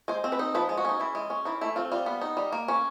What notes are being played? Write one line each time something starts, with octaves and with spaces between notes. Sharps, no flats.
G#3 C5
C4
B4
D#4
F3 B4
G#3
F#4
C#4 D#4
E3 E4
G#3
C#4
E3 D#4
A3 E4
C4 F4
G3 F4
B3
D#4
G3
A#3
C#4